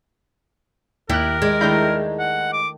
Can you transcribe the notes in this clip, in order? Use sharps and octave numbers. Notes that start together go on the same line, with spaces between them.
D#2 E4 G4 A#4 F#6
G#3 D5
D#3 A3 D4 E4 A#5 G6
F#5
D6